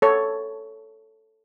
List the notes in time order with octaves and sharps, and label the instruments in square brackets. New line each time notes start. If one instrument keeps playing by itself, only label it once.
[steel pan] A4 C#5